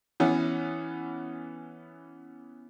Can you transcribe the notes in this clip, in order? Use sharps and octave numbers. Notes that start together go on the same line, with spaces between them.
E3 B3 C#4